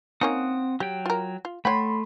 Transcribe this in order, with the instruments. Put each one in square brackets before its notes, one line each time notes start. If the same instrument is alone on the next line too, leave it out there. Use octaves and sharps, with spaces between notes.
[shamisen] A#3 C#4 D#4 [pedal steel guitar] C4 F#5 D#6
[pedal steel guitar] F#3 G5 [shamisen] G4
[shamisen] F4 A#4
F4
[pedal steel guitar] A3 [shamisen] C#5 F#5 G5 [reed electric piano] B5 C6